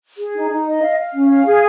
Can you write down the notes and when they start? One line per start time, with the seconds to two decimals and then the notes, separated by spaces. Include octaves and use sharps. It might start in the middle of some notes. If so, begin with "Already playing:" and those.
0.18 G#4
0.34 D#4
0.50 D#4
0.66 D#5
0.82 F5
0.97 F5
1.14 C#4
1.30 F5
1.46 G#4